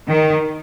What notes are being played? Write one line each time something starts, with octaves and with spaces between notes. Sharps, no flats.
D#3